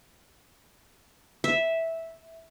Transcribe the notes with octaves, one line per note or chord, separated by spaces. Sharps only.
E5